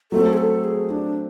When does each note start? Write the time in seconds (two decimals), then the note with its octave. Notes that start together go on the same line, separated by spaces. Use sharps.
0.12 F#3 A3 C4 A4
0.33 G#4
0.37 A4
0.64 G#4
0.90 D4